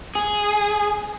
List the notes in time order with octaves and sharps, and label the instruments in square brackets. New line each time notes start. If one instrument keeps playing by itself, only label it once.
[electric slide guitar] G#4